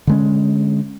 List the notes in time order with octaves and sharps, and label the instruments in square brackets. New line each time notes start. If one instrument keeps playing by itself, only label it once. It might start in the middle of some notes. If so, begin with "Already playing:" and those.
[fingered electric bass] D3 G#3 C#4